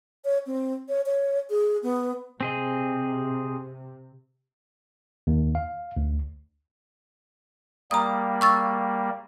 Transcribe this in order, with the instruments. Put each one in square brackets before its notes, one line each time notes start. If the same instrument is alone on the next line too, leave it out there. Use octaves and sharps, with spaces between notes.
[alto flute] C#5
C4
C#5
C#5
G#4
B3
[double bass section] C3 [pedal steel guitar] C4 G#4 D#5
[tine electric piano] D#2
F5
D2
[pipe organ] G3 A#3 [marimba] A#5 D#6
[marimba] C#6 E6 A6